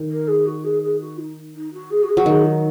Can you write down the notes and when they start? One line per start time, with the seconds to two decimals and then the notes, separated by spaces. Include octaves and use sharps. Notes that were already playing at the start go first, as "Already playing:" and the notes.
Already playing: D#3
0.10 A#4
0.27 G#4
0.46 F#4
0.64 G#4
0.82 G#4
1.00 F#4
1.18 D#4
1.55 D#4
1.73 F#4
1.90 G#4
2.02 F#4
2.08 G#4
2.17 F#3
2.26 D#3 G#4
2.44 D#4